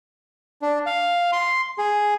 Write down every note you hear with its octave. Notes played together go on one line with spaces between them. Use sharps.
D4
F5
C6
G#4